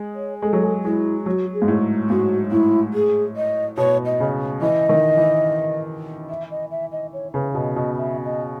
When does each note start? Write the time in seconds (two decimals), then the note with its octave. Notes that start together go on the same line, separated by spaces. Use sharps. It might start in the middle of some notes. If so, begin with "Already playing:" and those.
Already playing: G#3
0.15 C#5
0.42 G#3 A4
0.53 F#3
0.63 G#3
0.85 G#3 E4
1.26 F#3 F#4
1.53 G#4
1.62 G#2
1.68 A2
2.09 G#2 F#4
2.51 A2 E4
2.93 G#4
3.36 D#5
3.78 B2 C#5
4.06 D#5
4.20 C#3
4.61 E3 D#5
4.89 D#3
5.17 E3
6.29 E5
6.51 D#5
6.71 E5
6.92 D#5
7.13 C#5
7.34 C#3 B4
7.54 B2 D#5
7.76 B2 D#5
7.97 E5
8.24 D#5